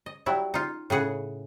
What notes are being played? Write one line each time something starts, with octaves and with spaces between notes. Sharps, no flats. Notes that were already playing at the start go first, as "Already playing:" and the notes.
D#5
F#3 G3 E4
D#4 F4
A2 C#3 G#4 F#5